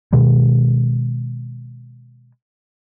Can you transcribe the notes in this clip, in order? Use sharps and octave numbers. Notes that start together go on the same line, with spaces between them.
B2 D#3 G#3